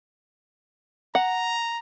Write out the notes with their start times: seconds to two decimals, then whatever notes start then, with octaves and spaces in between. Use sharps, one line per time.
1.15 F#5 A#5